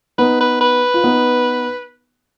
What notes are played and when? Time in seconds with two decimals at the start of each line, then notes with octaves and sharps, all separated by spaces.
0.18 B3 D#4 B4
0.41 B4
0.61 B4
0.94 F4
1.03 B3 D#4